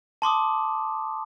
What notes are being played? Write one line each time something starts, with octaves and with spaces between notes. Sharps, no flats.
A5 C6 D6 D#6